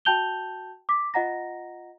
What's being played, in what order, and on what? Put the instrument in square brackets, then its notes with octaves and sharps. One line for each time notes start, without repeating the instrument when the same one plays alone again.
[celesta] F#4 G5 A5 G6 F7 G7
D6 B6
F4 D#5 F#5 A#5 A#6